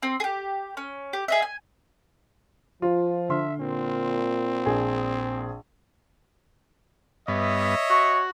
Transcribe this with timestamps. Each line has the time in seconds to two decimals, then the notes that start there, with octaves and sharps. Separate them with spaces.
0.03 C4
0.20 G4 G#4
0.77 C#4
1.13 G4
1.28 G#4 D#5 E5
1.42 G#5
2.82 F3 F4
3.29 D3 E5 C6 F6
3.60 A#2 C4
4.66 A#1 G#4
7.28 G2 B3 C#5 D#5 E5
7.90 F#4 C#6